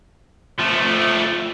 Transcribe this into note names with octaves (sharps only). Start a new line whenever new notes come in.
F3 A3